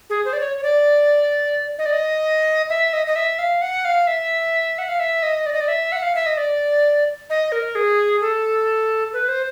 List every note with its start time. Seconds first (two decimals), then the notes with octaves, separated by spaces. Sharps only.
0.10 G#4
0.25 C5
0.33 D5
0.40 C#5
0.59 C#5
0.63 D5
1.79 D#5
1.86 D5
1.93 D#5
2.69 E5
2.93 D#5
3.07 D#5
3.16 E5
3.39 F5
3.62 F#5
3.85 F5
4.07 E5
4.78 F#5
4.89 F5
5.00 E5
5.23 D#5
5.46 D5
5.53 D#5
5.61 D5
5.68 E5
5.92 F#5
6.03 F5
6.15 E5
6.26 D#5
6.37 D5
7.30 D#5
7.52 A#4
7.75 G#4
8.21 A4
9.13 B4
9.28 C5